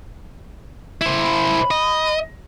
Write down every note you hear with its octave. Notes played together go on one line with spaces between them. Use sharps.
E4 C5
B5
D#5